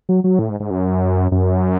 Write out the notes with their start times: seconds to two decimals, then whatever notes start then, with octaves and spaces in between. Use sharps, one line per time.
0.09 F#3
0.24 F#3
0.39 A2
0.50 G#2
0.60 G#2
0.70 F#2
1.32 F#2